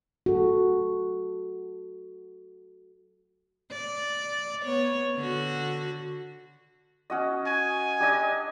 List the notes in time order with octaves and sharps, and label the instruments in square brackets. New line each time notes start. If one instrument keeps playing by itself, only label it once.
[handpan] F#4 A4
[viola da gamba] D5
B3 C#5
D3 F#4
[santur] C#4 F#4 D#5
[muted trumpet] G#5
[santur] G3 D4 D#5